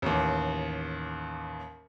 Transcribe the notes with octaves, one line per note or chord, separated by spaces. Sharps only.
A1 D#2